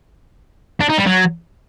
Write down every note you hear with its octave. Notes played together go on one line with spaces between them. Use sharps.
D4
D#4
G3
F#3